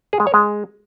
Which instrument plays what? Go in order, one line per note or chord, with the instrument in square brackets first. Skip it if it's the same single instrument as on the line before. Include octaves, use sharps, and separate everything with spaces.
[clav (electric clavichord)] G#4
G#3
C#5
G#3